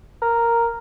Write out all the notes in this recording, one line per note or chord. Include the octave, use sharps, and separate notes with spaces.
A#4